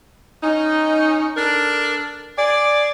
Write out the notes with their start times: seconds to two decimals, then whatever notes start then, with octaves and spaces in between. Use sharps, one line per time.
0.42 C#4 D#4
1.36 D4 A4 A#4
2.37 G#4 D5